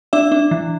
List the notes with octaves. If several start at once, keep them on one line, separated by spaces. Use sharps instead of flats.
D4 E5
D4
E3